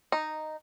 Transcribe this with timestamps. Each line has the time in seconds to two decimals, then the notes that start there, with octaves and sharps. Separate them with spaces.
0.12 D#4